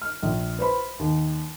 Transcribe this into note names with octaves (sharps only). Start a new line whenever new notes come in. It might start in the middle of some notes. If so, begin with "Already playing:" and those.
F6
A#1
B4 C5 B5
D#2